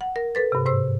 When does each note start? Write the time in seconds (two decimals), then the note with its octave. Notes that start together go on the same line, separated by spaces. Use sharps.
0.01 F#5
0.16 A#4
0.35 A4 B4 A6
0.52 G2 C3
0.66 G#2 C5 E6